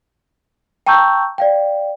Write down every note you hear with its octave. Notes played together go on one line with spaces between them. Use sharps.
G5 A5 A#5 C#6 E6 G6
D5 F5 G5